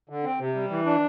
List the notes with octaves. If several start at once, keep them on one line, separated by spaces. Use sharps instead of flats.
D3
C4
C3
G3
E3
D4